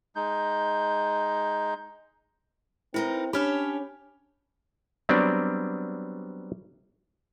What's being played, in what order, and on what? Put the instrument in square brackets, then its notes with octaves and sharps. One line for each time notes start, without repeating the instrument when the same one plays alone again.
[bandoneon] G#3 D#4 G6
[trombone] C4 [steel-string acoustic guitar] D#4 A#4 B4 [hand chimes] E4
[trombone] C#4 [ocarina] D4 [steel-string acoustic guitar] G4 C#5 A5 [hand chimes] B5 F6
[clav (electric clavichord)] F#3 G3 B3 C4 D4 D5